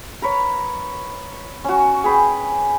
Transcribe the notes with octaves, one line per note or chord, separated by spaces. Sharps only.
A#4 B4 C#5
C#4 F#4
G#4 B4 G5